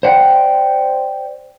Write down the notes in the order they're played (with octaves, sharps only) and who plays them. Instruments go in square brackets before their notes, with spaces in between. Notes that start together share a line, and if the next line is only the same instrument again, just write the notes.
[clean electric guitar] C5 D5 F#5 G5